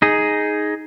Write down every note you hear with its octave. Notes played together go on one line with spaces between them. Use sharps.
D#4 G#4